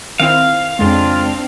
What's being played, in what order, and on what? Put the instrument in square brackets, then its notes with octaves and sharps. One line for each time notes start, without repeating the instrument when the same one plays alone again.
[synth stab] D#3 C4 E4 [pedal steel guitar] F5
[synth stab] F2 C#3 G#3 [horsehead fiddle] C4 D4 [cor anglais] F4